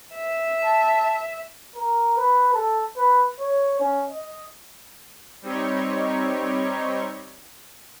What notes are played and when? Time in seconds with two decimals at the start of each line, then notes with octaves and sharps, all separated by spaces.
0.15 E5
0.63 A5
1.76 A#4
2.17 B4
2.54 A4
2.97 B4
3.40 C#5
3.80 C#4
4.10 D#5
5.42 G3 C4 D#4 G4 C#5